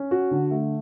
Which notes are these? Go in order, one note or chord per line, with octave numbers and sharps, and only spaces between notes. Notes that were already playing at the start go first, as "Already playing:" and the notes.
Already playing: C#4
F#4
D3
A3